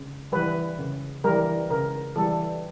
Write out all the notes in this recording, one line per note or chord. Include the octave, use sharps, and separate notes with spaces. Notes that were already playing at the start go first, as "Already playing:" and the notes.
Already playing: C#3
E3 G3 B4
C#3
E3 G3 A#4
C#3 A#4
E3 G3 A4